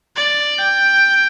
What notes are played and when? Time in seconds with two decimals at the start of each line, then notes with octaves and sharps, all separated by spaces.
0.16 D5
0.58 G5